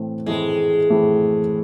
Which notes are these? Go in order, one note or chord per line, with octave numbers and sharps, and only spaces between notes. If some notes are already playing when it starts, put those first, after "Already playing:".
Already playing: A2 E3 A3 C4
A2 E3 G#3 A3 C4
A2 E3 A3 C4